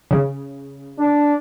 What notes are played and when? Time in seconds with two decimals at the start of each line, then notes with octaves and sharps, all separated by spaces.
0.11 C#3
0.99 D4